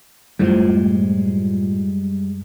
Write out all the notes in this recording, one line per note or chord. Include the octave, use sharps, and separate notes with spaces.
F#2 A2 F3 G3 G#3